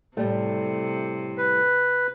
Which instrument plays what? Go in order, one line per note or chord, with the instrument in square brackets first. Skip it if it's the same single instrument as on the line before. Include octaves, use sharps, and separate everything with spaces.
[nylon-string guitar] A2 G3 A3 [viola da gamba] C3
[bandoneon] B4